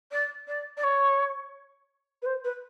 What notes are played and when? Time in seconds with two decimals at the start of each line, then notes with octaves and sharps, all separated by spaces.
0.11 D5
0.48 D5
0.77 D5
0.84 C#5
2.22 B4
2.26 C5
2.44 B4